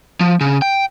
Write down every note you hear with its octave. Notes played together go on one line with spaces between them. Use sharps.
F3
C#3
G5